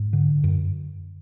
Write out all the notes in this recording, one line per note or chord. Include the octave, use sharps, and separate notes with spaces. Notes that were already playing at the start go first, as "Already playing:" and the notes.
Already playing: G#2
D3
F#2